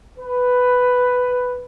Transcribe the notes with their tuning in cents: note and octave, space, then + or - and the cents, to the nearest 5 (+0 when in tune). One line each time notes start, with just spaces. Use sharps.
B4 +5